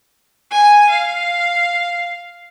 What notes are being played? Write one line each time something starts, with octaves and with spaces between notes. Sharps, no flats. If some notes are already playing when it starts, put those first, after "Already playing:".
G#5
F5